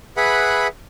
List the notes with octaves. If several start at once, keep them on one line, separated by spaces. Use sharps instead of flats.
G#4 B4 E5 F#5 B5